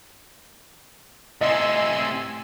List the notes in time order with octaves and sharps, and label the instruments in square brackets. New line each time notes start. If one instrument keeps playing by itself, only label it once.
[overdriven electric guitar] A2 C3 [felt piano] D#5 [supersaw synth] G#5 C6 E6